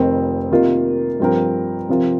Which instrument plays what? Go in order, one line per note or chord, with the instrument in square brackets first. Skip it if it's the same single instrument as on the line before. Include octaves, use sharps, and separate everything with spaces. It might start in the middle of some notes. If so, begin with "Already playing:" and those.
Already playing: [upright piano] F1 F2 D#3 C4
C3 D#3 A#3 F4 A#4
G2 F3 C4 G4 A#4
C3 F3 C4 F4 A#4